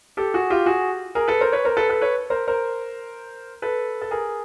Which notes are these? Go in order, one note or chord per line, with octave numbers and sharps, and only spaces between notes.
G4 A4
F#4 G#4
F4 G4
F#4 G#4
G#4 A#4
A4 B4
A#4 C5
B4 C#5
A#4 C5
A4 B4
A4 B4
B4 C#5
A#4 C5
A#4 C5
A4 B4
A4
G#4 A#4